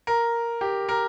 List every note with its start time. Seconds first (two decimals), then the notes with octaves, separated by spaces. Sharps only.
0.07 A#4
0.61 G4
0.89 A#4